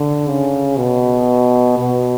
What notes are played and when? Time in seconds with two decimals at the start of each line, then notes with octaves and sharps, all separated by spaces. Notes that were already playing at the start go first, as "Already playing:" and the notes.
Already playing: D3
0.28 C#3
0.77 B2
1.78 B2